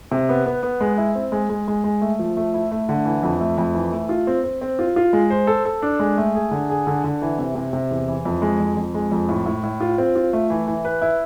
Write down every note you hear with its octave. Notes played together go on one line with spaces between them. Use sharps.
C3
B3
B3
B3
G#3
E4
C4
G#3
G#3
G#3
G#3
A3
F3
A3
E4
A3
D3
E3
F2
A3
F2
E3
A3
F4
C4
C4
C4
F4
F4
G#3
C5
A4
A4
D4
G#3
A3
G#4
D3
G#4
D3
D3
E3
C3
C3
C3
E2
E3
F2
G#3
F2
F2
G#3
F2
A2
A2
A2
F4
C4
F4
A3
E3
E3
B4
E4